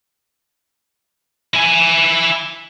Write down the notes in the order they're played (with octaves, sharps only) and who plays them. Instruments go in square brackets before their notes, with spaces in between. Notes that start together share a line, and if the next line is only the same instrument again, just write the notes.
[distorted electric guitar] E4 G#5